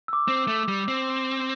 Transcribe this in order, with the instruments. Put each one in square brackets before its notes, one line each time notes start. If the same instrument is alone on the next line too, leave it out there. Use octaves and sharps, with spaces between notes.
[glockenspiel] E6
D6
[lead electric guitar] C4
A3
G3
C4